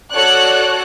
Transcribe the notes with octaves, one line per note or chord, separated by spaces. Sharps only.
F#4 A4 C#5 D5 F#6